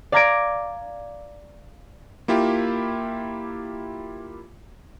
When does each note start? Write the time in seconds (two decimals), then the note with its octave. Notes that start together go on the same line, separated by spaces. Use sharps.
0.12 D5 F5 A#5 G#6 A#6 D7
2.28 A#3 E4 F4 G4